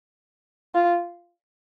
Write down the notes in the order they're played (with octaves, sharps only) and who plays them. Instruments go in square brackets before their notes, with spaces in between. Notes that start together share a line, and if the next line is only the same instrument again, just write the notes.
[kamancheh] F4